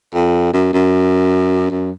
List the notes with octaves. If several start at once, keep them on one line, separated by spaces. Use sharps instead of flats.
F2
F#2
F#2
F#2